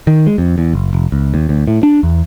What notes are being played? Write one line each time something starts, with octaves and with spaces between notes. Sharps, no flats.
D#3
G#3
F2
E2
F#1
F1
C#2
D#2
D2
A2
D4
E2